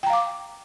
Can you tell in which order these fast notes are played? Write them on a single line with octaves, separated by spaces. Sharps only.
G5 A#5 F5 D6